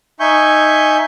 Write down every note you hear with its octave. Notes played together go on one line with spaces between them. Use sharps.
D#4 E5 G#5 C#6 G6